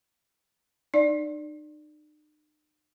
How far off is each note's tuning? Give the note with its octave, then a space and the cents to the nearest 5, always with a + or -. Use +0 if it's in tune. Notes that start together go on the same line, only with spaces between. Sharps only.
D#4 -45 D5 +0